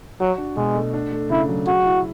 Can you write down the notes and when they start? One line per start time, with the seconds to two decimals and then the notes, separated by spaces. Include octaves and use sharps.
0.20 F#3 F#4
0.38 D4
0.57 B2 G#3
0.75 A3
0.94 D4
1.12 A3
1.30 C#3 E4
1.49 F#3
1.67 F#4 G#4
1.86 E4